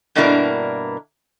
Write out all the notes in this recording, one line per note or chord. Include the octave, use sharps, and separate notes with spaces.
G2 B2 A#3 D4 E4 A#4